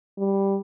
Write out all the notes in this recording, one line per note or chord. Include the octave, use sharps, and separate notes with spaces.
G3